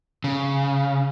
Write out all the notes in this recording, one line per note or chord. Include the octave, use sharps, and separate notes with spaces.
C#3